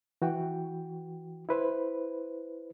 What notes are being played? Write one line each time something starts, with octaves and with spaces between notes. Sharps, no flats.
E3 F#4 G5
E4 B4 C5